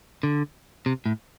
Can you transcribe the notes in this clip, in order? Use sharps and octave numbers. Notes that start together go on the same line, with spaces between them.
D3
C3
A2